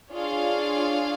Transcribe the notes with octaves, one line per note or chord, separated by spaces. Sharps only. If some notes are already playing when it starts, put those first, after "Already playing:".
D4 F4 G#4 C#5 F5